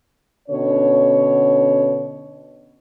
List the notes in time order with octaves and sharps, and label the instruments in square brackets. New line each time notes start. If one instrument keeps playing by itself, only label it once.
[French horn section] B2 D3 C#4 C#5